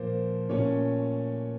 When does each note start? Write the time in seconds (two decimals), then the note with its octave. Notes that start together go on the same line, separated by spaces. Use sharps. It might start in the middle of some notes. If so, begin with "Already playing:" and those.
Already playing: A#2 F3 A#3 C5
0.49 A#2 A3 C#4 C#5